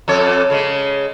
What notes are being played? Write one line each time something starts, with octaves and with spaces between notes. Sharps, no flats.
F2 A4 C#5
C#3 G#3